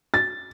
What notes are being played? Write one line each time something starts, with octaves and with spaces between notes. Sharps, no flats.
A6